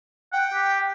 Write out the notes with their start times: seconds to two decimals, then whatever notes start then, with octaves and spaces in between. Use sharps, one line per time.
0.32 F#5 G5
0.53 G4